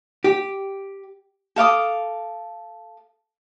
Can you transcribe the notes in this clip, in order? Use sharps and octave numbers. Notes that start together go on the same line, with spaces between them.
G4
A4 F5 D6 D#6